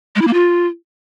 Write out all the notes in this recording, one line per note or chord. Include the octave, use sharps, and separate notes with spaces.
G#3
E4
A#3
F4